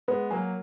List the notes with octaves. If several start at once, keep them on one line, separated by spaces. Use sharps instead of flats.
G#3 B3 B4
F#3 A#3 G#5